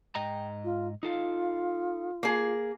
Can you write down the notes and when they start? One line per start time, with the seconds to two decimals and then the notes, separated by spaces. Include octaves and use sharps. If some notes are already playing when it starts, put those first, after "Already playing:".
0.15 G#2 D#5 G5 A#5
0.64 F4
1.03 D#4 F4 A4 F5
2.23 A#3 G#4